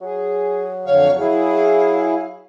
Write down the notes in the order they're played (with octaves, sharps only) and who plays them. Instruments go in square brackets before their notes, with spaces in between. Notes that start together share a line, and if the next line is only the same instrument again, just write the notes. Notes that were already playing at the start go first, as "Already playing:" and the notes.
[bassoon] F#3 [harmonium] G#4
[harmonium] F2 D3 F5 [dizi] C#5
[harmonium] E4 G#4 [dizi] F5